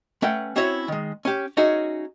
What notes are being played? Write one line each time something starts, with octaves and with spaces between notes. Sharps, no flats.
A3 C#4 B4 F#5 G5
C4 C#4 E4 F#4 C#5 E5
D#3 G#3
C#4 G4
C#4 D#4 F#4 G#4 E5